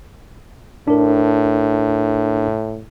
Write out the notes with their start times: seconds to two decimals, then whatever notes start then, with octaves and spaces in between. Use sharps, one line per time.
0.88 A2 D4 A#4